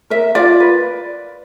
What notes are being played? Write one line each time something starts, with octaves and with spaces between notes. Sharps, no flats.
A#4 E5
F4 D5
B4